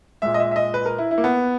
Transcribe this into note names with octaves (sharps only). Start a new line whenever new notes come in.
A#2 G#3 E5
D#5
E5
E5
D#5
B4
A#4
E4
E4
A#3
B3